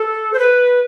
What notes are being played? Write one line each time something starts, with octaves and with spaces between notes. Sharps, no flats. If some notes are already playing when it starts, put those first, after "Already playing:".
Already playing: A4
C5
B4